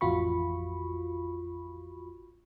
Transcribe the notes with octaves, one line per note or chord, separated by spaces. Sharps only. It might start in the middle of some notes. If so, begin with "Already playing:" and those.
A1 F2 F4 F#4 B5 C#6